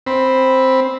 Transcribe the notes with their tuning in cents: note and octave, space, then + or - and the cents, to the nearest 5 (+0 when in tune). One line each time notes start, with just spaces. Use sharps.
C4 +5 B5 +0